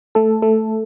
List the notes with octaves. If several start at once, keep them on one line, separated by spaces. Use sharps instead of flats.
A3 A4
A3 A4